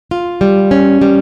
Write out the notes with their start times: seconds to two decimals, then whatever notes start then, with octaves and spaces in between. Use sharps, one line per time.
0.11 F4
0.41 G3
0.71 C#4
1.02 G3